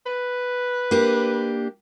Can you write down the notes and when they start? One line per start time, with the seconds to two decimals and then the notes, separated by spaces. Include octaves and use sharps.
0.06 B4
0.91 A#3 D4 G4